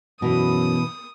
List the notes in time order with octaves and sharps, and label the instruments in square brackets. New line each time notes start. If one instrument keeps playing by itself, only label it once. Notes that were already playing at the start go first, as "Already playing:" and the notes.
[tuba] F#2 [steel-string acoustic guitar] B2 E3 [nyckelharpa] D#6